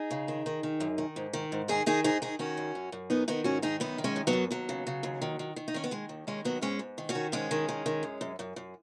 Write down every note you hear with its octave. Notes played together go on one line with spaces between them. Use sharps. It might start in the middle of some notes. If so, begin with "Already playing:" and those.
Already playing: D#4 G#4
C#3
D#3
D#3
D#3
F#2
D#3
G#2
D#3
G#2
D#3 D#4 G#4
D#3 D#4 G#4
G#2 D#4 G#4
D#3 D#4 G#4
D#3 C#4 F#4
F#2
F#2
F#2
D#3 B3 D#4
D#3 B3 D#4
G#2 C#4 F#4
D#3 D#4 G#4
F#2 B3 D#4
D#3
G#3 C#4
F#2
F#3 B3
F#2
D#2 F#3
C#3
C#3
D#2
D#3
D#3
D#3
D#4
D#3 C#4
B3
D#3 G#3
D#2
D#3 G#3 C#4
D#2 F#3 B3
G#2 G#3 C#4
G#2
D#3
C#4 F#4
D#3
G#2 G#3 C#4
D#3
D#3
D#3
F#2
F#2
F#2
F#2